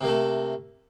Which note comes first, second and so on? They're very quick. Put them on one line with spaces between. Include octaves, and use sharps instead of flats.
C3 A#3 A3